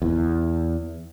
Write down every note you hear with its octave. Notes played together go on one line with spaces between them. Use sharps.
E2